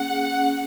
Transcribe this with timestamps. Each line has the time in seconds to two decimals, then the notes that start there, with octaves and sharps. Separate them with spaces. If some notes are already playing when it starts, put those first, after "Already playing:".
Already playing: A#3 C#4 G#4 F#5
0.10 G#4
0.32 C#4